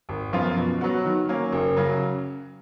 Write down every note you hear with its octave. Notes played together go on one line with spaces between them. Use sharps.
G#1
F#2 F3 B3 F4
B2
F#3 B3 F#4
D#3
F#3 A#3 C#4
F#1
C#3 F#3